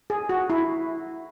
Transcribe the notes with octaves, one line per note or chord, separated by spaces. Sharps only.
G#4
F#4
E4